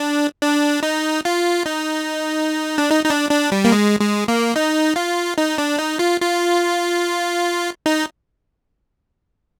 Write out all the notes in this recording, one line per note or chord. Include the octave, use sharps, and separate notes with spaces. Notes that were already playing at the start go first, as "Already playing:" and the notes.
Already playing: D4
D4
D#4
F4
D#4
D4
D#4
D#4
D4
D4
G3
A#3
G#3
G#3
A#3
D#4
F4
D#4
D4
D#4
F4
F4
D#4